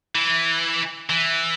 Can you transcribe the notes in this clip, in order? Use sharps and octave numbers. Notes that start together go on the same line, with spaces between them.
E3
E3